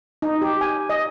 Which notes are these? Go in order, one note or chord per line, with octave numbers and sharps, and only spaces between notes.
D#4
G4
G#5
D#5